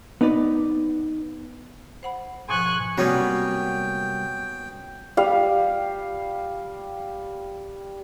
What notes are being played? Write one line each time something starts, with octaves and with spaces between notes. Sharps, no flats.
B3 D#4 B4 D5
C5 F#5 B5
G#2 B2 F3 G#5 C#6 F#6
C3 F#3 G3 A#3 B3 C#4 B4 G5
G3 F5